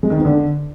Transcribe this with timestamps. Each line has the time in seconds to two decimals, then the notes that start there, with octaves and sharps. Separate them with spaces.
0.03 G#3
0.10 D#3
0.18 B3
0.25 D3